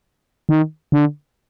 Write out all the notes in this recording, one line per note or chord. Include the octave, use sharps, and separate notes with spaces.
D#3
D3